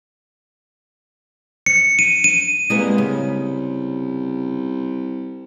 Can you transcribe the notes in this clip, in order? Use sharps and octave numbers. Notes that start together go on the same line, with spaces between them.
C#7
D#7
D#7
C2 G#3 A#3 B3
C#3